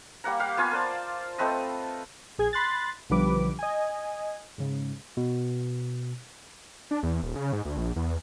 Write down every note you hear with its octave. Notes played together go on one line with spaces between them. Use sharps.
G3 A#3 F#5 A#5
G4 F5 F#5
B3 F4 G#5
A#4 C5 D5 A5
A3 C4 B4 D#5
A#1 G#4 G#6
B5 C6 F#6 A6
B1 D3 F3 G3 B4 D6
D#5 G#5
G#2 C#3
B2
D4
E2
D#1
C#3
G#2
D2
A#1
E2